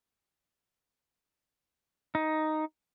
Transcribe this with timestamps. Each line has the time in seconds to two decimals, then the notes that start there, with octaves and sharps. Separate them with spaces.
2.15 D#4